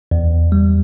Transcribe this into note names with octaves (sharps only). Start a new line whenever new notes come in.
E2
G3